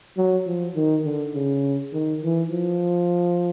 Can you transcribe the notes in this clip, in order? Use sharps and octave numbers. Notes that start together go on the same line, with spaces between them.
F#3
F3
D#3
D3
C#3
D#3
E3
F3